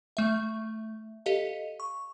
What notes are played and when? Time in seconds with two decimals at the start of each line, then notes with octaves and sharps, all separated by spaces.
0.17 A3 E5
1.26 G4 A4 D#5 F5
1.80 C#6